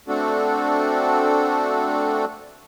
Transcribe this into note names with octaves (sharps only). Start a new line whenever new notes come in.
A3 C4 D4 F#4 A4